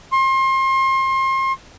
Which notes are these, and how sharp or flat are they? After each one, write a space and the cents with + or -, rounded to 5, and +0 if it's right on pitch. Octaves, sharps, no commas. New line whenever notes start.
C6 +35